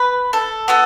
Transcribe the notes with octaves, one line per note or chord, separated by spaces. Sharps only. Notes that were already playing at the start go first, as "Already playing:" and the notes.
Already playing: B4
A4
B3 F#4 A4